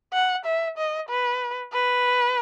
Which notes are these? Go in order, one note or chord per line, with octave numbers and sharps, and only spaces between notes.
F#5
E5
D#5
B4
B4